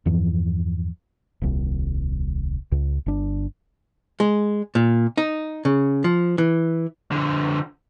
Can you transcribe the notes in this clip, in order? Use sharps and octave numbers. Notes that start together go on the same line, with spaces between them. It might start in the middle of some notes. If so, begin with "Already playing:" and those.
E2 G2 E3 F3
D#1 C2
C#2
G1 D4
G#3
A#2
D#4
C#3
F3
E3
D3 F3